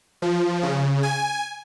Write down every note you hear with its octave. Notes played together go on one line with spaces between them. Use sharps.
F3
C#3
G#5